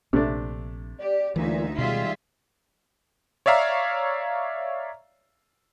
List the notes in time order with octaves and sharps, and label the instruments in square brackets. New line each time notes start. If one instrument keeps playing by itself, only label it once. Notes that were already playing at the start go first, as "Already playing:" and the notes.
[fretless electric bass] A#1 [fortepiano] C3 A3 D4
[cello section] G4 [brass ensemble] D5
[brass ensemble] G1 A#2 [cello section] D2 D#4 E5 [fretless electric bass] E3
[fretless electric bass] B2 [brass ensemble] D#3 G3 G#3 [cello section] F4 G#4 E5
[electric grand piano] C#5 D5 E5 F5 A#5